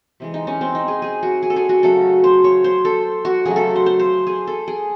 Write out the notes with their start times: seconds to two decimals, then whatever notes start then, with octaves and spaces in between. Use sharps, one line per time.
0.20 C3 E3 G#3
0.34 D#4
0.47 C#4
0.61 C4
0.75 D#4
0.88 G#4
1.02 G#4
1.23 F#4
1.43 G#4
1.50 A4
1.56 G#4
1.69 F#4
1.83 C#3 F#3 A3 A4
2.24 C5
2.44 C#5
2.64 C5
2.85 A4
3.25 F#4
3.45 C#3 F#3 A3 G#4
3.56 A4
3.75 C5
3.86 C5
3.99 C5
4.27 G#4
4.47 A4
4.68 G#4